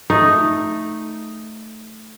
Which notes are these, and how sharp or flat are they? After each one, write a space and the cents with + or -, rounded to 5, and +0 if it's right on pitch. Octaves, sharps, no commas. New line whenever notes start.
A3 +0 D#4 +0